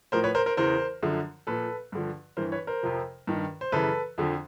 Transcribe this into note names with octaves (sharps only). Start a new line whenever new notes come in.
A2 F3 A#4 C5
B4 C#5
A#4 C5
A#4 C5
E2 C#3 E3 A#4 C5
F#2 D3 F3
A#2 F3 A4 B4
G2 D3 F3
G2 E3 A#4 C5
B4 C#5
A#4 C5
F2 C3 F3
G2 D#3
C5
F#2 C#3 E3 A4 B4
F2 D3 F3